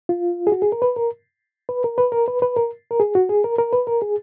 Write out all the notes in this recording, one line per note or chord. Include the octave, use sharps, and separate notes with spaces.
F4
G#4
F#4
G#4
A#4
B4
A#4
B4
A#4
B4
A#4
B4
B4
A#4
A#4
G#4
F#4
G#4
A#4
A#4
B4
A#4
G#4